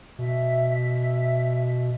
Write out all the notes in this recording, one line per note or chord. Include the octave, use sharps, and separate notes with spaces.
B2 E5